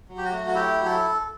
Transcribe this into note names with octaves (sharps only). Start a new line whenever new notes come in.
F#3
G4
F#4
A3
F#4
E4 G4
F#3
A4